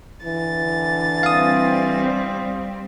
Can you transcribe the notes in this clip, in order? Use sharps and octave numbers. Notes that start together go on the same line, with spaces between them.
D3 E3 A6
G3 C4 F5 D#6